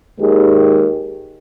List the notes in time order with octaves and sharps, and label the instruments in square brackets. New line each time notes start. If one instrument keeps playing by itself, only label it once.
[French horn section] D#2 D#3 G#3 G4 G#4 A#4